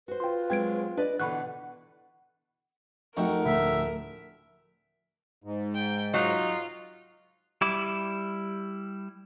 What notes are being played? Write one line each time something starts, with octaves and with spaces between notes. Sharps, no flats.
F#4 B4 C5
F4 G5 C6
F#3 G#3 C4 G5 G#6 D7
D4 B4 D5 D#5
B2 D3 E3 F#5 B5 C#6 F#6
F2 A3 D#4 F#4 A#4 G5 C#6
D2 A2 E5
G#2
G5
F#3 D#4 F4
G3 E4 D6